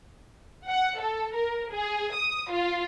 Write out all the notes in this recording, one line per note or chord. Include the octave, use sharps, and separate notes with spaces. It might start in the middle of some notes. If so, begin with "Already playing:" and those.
F#5
A4
A#4
G#4
D#6
F4